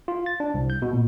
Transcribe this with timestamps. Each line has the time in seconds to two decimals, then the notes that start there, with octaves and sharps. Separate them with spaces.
0.08 F4
0.26 A6
0.40 D4
0.54 C2
0.70 G6
0.82 B2
0.94 A#2